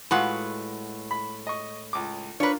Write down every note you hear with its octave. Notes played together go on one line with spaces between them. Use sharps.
A2 G#3 F4 F#4 B4 F#5
B5
D#5 C#6
C#2 D6
D4 F4 A#4 B4 C#5